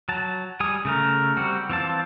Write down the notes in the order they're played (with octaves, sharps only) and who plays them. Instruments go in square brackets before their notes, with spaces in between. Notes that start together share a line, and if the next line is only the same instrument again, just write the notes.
[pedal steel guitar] F#3 A5
G3 G#5 D#6
C#3 A3 A#4
G3 C4 F#4
E3 C4 F4 A5